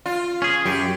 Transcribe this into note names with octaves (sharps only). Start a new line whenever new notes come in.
F4
C#4 G#4
F#2 G4